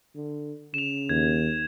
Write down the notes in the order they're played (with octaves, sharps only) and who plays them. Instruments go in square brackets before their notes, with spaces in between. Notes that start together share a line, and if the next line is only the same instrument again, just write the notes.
[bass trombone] D3
[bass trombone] C#3 [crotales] E7 F7
[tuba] D#2 [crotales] G#6